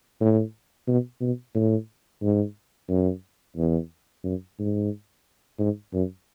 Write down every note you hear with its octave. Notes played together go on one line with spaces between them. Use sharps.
A2
B2
B2
A2
G#2
F#2
E2
F#2
G#2
G#2
F#2